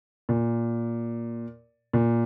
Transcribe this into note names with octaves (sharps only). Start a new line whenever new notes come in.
A#2
A#2